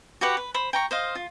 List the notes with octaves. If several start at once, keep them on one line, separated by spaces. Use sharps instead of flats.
F#4 G4 B4 F#5
B4
C5 B5
G5 A#5 C#6
C5 D#5 F5
F4